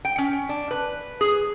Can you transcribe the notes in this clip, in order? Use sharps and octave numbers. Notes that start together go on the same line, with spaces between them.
G5
C#4
D4
B4
G#4